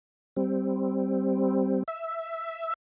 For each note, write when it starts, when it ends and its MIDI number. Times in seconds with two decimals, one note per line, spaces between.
0.37 1.83 55
0.37 1.83 60
1.88 2.73 76